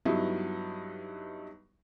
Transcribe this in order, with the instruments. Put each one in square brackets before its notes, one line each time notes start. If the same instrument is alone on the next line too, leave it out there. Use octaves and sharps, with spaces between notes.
[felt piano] G2 F#3 B3 D#4 E4